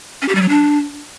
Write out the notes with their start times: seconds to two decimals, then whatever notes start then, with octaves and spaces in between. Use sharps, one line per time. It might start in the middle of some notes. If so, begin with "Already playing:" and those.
0.22 C#4
0.29 G4
0.35 G3
0.42 F#3
0.49 D4